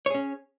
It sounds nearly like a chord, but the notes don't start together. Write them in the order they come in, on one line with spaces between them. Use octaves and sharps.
C#5 G#4 C#4